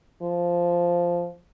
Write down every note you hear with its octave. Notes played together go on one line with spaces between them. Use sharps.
F3